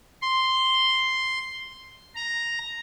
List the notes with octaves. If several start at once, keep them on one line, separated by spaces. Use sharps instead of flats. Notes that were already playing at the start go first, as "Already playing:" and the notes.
C6
A#5